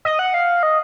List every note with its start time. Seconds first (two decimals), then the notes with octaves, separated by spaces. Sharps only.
0.05 D#5
0.19 F#5
0.34 F5
0.63 D#5